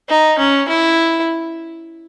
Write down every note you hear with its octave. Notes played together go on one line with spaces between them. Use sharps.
D#4
C#4
E4